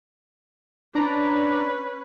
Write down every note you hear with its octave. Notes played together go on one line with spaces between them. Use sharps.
C#4 D4 B4 D5 A#5